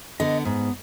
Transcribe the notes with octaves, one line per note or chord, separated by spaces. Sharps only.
D3 B3 D#5
G#2 B3